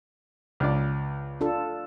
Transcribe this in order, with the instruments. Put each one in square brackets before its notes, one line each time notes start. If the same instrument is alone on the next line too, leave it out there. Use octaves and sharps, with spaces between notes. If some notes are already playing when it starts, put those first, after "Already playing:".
[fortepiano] C#2 D4 D5
[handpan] D4 F4 A4